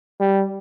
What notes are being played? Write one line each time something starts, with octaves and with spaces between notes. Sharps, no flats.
G3